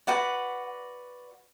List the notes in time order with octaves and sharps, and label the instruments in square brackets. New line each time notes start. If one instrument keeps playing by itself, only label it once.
[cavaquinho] F#4 B4 D5 F#5